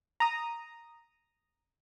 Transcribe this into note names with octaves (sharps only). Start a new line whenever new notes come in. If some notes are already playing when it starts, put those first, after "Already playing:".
A#5 D#6